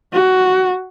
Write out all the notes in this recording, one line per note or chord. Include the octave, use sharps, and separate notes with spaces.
F#4